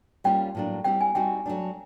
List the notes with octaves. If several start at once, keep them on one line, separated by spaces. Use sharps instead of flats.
G3 A#3 C#4 F4 G5
A2 F#3 A#3 D4
G3 C4 E4 G4 G5
G#5
G3 C4 D#4 F#4 G5
F#3 A3 D4